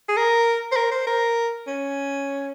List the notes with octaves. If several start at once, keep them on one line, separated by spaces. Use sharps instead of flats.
G#4
A#4
C5
A#4
C5
A#4
C#4